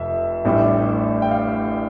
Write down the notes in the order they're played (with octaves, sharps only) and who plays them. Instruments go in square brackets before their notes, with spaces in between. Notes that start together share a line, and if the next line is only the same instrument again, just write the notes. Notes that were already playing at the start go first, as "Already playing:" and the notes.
Already playing: [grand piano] F1 F2 E5
A1 A2 G3 D4
G5
F5